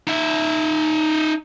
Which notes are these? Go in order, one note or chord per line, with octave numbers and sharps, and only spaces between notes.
D#4 E5